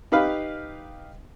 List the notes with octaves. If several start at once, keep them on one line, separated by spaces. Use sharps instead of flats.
D#4 G4 B4 F5